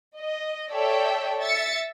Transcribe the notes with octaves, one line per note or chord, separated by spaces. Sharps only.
D#5
A4 C#5 D5 E5 G5
E5 A6 C#7